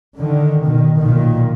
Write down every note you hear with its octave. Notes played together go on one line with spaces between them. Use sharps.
D3 D#3
B2 D#3
B1 A#2 D#3